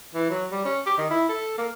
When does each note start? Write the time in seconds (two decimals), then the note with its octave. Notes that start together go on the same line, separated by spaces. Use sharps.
0.15 E3
0.30 F#3
0.52 G3
0.65 C#4
0.86 G4
0.98 D#3
1.10 E4
1.29 A4
1.58 A#3